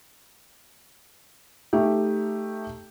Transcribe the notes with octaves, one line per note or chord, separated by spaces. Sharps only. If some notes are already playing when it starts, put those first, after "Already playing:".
A3 D#4 G4